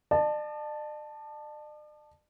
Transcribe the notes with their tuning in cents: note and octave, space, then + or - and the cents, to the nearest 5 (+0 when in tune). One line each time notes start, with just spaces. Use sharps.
D5 +45 A5 +0